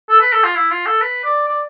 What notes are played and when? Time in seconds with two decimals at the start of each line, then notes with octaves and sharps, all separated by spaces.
0.09 A4
0.21 B4
0.32 A4
0.44 F4
0.55 E4
0.71 F4
0.86 A4
1.01 B4
1.24 D5
1.47 D5